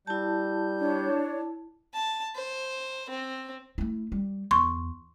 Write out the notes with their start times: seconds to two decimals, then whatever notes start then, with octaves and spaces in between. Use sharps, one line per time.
0.07 G3 E4 A5 G6
0.79 D4 C#5
1.93 A5
2.35 C5
3.09 C4
3.78 A3 E4
4.12 G3
4.51 E2 C6 C#6